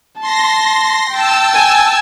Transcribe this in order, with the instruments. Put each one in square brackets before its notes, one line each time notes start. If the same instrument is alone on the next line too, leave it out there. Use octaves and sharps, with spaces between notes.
[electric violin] A5 [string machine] C6 A#6
[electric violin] G5 [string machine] A5 E6
[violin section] G#5